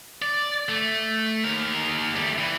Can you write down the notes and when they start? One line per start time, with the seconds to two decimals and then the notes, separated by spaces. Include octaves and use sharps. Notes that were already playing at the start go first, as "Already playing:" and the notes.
0.22 D5
0.69 A3
1.44 D#2 A#4
2.16 G3 A3
2.38 E3